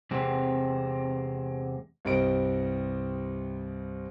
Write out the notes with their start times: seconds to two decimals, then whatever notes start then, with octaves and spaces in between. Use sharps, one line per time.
0.11 E2 C3 G#3 C4
2.05 C2 G2 C4 D#5 D7